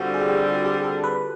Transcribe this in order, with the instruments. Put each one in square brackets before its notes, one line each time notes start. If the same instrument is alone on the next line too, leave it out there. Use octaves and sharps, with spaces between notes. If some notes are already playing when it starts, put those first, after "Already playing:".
Already playing: [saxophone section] D3 G3 C4 [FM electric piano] F4 F#4
[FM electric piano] G#4
G4
G4
G4
A4
B4